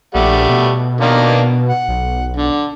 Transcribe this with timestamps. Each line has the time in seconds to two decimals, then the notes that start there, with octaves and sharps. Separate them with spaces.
0.15 A#1 G3 A3 F#5
0.49 B2
1.01 D#3 A#3 D4
1.69 F#5
1.88 B1
2.36 D3